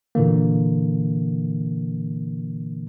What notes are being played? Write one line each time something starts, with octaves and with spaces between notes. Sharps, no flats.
A#2 D3 E3 A#3